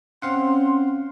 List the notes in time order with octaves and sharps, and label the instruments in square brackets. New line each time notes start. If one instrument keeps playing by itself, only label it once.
[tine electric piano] C4 F5 F#5 [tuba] C#4 [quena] C6